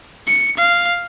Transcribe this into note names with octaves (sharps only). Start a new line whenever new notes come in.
C#7
F5